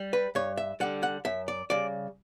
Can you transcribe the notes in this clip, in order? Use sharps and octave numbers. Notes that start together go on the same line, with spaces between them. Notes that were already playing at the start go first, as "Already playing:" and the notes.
Already playing: G3
B4
G2 C#5
E5
D3 G3 F#5
F#5
F#2 E5
D5
C#3 G3 D5